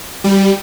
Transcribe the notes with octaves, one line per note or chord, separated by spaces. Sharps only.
G3